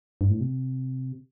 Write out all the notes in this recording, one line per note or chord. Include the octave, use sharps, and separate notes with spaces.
G2
A2
C3